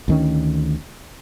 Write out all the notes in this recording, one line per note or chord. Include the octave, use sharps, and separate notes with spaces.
D2 D#3 C#4